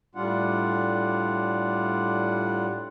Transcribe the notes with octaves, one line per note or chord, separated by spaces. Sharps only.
A2 G3 D4 F4 F#5